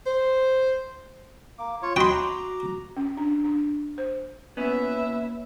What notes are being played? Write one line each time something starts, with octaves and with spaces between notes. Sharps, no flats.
C5
A#3 D6
F4 C#5
F#4 D#5 G5 B5 C6
A#5 D6
C#4
D4
D4
C5
A#3 B3 C#4 E4 B4 E5